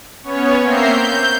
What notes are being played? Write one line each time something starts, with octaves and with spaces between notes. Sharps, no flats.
B3 C#4 C#5
A#3 C4 E5 A#5 G6 C7
G6